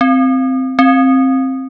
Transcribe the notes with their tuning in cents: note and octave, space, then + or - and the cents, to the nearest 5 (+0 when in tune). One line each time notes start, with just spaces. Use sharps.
C4 -5
C4 +15